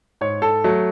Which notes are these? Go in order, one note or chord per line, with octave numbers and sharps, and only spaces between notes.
G#2 C#5
A4
F#3 A3